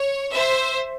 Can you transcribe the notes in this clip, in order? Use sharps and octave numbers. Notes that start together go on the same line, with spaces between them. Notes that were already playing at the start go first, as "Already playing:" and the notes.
Already playing: C#5
C5 E5